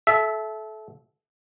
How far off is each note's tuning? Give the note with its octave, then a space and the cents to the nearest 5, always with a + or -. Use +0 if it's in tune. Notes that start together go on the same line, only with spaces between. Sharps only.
A4 -30 E5 +0